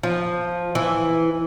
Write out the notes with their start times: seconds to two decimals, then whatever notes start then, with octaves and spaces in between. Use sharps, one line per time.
0.03 F3
0.75 E3